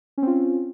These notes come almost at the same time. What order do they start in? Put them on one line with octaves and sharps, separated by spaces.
C#4 C4 F4